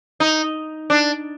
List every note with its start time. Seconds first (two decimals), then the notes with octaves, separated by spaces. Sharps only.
0.20 D#4
0.90 D4